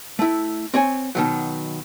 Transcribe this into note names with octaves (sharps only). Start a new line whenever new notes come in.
A3 E4
C4 C#5 G#5
B2 D#3 F#3